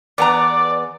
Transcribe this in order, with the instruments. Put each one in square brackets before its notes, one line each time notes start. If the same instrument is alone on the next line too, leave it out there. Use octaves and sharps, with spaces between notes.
[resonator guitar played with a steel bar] E2 B3 A#5 [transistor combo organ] D5